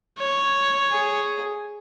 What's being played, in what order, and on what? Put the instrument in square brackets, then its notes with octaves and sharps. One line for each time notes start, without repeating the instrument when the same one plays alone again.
[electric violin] C#5
[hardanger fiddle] G#4